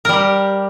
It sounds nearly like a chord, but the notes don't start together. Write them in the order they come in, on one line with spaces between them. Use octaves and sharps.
A#4 G3 G4